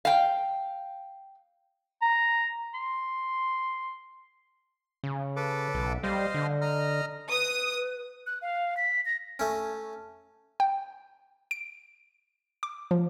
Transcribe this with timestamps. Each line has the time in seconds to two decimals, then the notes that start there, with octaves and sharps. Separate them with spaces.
0.05 F5 G5
2.02 A#5
2.75 C6
5.04 C#3
5.36 A4 B4 D6
5.74 B1
6.03 G3 C5 D#5 F5
6.34 D3
6.61 D#5 A#5 F6
7.30 B4 D#6
8.27 F#6
8.42 F5
8.77 B6
9.06 A#6
9.39 A3 C#4
10.60 G5
11.51 D7
12.63 D6
12.91 F3